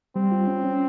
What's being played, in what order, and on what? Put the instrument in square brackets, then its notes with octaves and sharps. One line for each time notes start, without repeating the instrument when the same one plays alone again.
[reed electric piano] G3 [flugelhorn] C4
[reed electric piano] F4
C#4
C#4